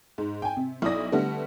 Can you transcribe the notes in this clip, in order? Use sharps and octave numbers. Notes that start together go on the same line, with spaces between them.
G#2
G5 G#5
C3
B1 E4 D5 D#6 A#6
D3 G3 A3 B3